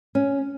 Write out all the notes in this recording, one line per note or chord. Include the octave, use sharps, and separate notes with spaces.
C#4